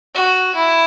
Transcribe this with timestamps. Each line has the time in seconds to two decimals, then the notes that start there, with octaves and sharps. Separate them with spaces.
0.15 F#4
0.56 E4